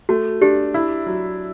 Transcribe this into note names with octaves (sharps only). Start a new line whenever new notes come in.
A3 F#4
D4 G4
E4
F#3